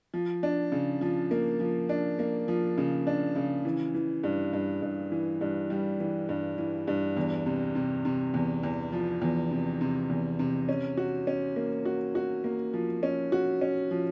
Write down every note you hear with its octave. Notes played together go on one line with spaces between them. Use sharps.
F3
D4
C#3
F3
A#3
F3
D4
A#3
F3
C#3
D4
C#3
E3
E3
G2
G2
G2
E3
G2
G3
E3
G2
E3
G2
E2
C3
C3
C3
E2
E2
F3
E2
C3
C3
E2
C3
C#4
F#4
C#4
A#3
F#4
F#4
A#3
F3
C#4
F#4
C#4
F3